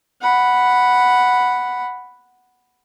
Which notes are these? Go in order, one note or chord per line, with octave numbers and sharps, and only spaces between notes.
F#5 B5